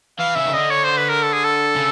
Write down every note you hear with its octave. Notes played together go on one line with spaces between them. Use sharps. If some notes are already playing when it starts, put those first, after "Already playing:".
E3 F5
C#3 E5
D#3
D3 D#5
C#5
C5
B4
A#4
A4
G#4
A4
C#3